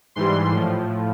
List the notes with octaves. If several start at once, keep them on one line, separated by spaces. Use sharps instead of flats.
G#2 E3 G3 C6
A2 F3